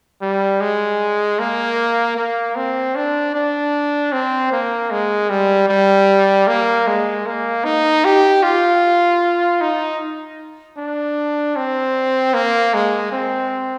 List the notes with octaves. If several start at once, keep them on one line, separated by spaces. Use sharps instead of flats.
G3
G#3
A#3
A#3
C4
D4
D4
C4
A#3
G#3
G3
G3
A#3
G#3
A#3
D#4
G4
F4
D#4
D4
C4
A#3
G#3
C4